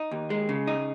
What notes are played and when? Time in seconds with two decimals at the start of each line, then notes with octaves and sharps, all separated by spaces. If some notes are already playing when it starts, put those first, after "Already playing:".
Already playing: D#4
0.11 D#2
0.30 G#3
0.49 C#3
0.67 D#4